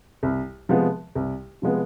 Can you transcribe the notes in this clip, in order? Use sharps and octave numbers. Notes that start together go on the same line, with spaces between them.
C2
C3 F3 G#3 B3
C2
C3 F3 G#3 B3